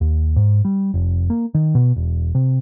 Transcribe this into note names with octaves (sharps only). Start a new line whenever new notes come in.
D#2
G#2
G3
F1
A#3
D#3
B2
E1
C3